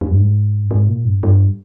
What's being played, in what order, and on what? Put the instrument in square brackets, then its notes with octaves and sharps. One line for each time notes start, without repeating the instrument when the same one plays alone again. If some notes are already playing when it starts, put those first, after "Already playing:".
[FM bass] F2
G2
G#2
G2
G#2
A#2
G2
G2